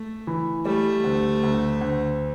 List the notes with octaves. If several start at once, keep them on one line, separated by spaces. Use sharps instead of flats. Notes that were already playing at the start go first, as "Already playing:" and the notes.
Already playing: A3
E3
G3 A3
D2
D2
D2